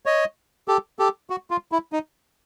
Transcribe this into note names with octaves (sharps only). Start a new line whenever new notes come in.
C#5 D#5
G4 A4
G4 A4
F#4
F4
E4
D#4